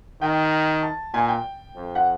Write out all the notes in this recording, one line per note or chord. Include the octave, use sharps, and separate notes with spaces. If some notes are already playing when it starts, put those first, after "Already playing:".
D#3 G5
A5
A#2 G#5
G5
F2
F#5